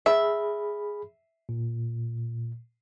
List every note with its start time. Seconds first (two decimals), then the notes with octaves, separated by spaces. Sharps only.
0.06 G#4 E5 B5
1.49 A#2